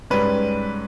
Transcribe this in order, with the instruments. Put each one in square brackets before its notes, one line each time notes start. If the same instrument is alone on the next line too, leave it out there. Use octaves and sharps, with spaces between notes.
[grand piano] G#2 G3 C#4 B4